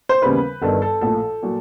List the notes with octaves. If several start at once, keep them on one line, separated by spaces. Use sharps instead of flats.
C5
D#2 C#3 E3 G3 B3 B4
G1 G2 D#3 A4
A4
A#1 A2 F3 A4
A#2 F#3